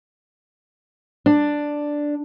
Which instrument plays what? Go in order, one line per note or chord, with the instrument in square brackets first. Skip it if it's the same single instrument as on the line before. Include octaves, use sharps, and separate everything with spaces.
[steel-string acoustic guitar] D4